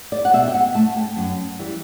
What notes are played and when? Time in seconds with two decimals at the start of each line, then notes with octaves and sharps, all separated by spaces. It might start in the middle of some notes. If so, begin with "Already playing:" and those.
0.12 D5
0.25 F#5
0.33 B2 E5
0.48 G5
0.54 F#5
0.75 A3 A5
0.97 G5
1.17 F#2
1.59 E3 G3